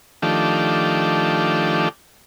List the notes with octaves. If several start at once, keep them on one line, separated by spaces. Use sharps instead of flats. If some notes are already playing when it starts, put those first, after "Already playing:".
D#3 F3 A3 D4 G4